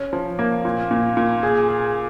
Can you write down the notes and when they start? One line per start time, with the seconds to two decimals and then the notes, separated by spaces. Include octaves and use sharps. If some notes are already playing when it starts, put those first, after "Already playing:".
Already playing: C#4
0.13 F3
0.39 A#3
0.65 A#2
0.91 A#2
1.17 A#2
1.43 G#4
1.69 G#4